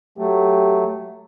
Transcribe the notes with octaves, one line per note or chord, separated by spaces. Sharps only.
F#3 A3 G4